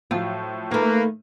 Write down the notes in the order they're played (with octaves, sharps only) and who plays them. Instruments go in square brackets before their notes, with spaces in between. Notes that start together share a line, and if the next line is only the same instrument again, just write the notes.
[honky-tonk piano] A2 F3 F#3 [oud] F4
[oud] D#3 A3 [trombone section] A#3 B4